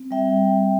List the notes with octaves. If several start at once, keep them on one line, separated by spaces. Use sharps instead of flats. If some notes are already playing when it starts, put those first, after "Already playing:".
Already playing: C4
G3 E5 G5